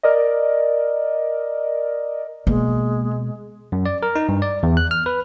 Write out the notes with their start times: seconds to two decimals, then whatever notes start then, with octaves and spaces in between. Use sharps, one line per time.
0.03 A#4 D5 D#5
2.47 B2 G#3 A#3
3.72 F#2
3.86 D5
4.03 A#4
4.16 D#4
4.29 G2
4.42 D5
4.63 E2
4.77 F#6
4.91 F6
5.06 B4